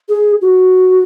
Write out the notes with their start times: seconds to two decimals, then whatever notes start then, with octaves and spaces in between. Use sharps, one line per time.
0.09 G#4
0.41 F#4